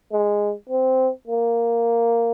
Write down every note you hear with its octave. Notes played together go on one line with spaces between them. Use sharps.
G#3
C4
A#3